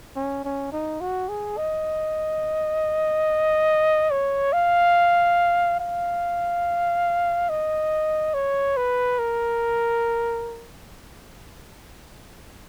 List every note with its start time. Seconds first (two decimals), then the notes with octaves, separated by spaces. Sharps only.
0.16 C#4
0.45 C#4
0.72 D#4
1.01 F#4
1.29 G#4
1.58 D#5
4.11 C#5
4.53 F5
5.80 F5
7.50 D#5
8.34 C#5
8.77 B4
9.19 A#4